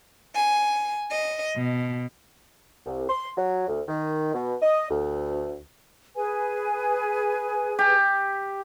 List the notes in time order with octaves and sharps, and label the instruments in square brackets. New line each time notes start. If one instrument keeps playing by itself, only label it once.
[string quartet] G#5
D#5
B2
[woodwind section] C2
C6
F#3
D2
D#3
B2
D#5
D2
[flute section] G#4 B4 G#5
[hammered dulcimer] G4